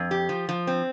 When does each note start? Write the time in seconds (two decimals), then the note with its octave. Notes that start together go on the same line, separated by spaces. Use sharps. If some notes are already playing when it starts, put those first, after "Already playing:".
Already playing: F2
0.11 G4
0.29 F3
0.49 F3
0.67 C4